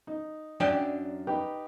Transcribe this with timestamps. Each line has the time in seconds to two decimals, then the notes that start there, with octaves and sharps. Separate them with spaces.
0.07 D#4
0.60 F#2 D4 D5 G5
1.27 D#4 G4 B4